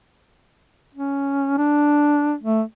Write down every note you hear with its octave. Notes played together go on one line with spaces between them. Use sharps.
C#4
D4
A3